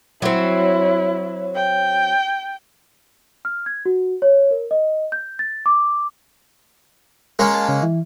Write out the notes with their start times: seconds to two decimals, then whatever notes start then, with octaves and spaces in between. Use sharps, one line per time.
0.22 F#3 C4 E4
1.55 G5
3.45 F6
3.66 G#6
3.85 F#4
4.22 C#5
4.51 A#4
4.71 D#5
5.12 G6
5.39 A6
5.66 D6
7.39 G#3 A#3 C#4 A#4
7.54 A5
7.69 C#3
7.83 E3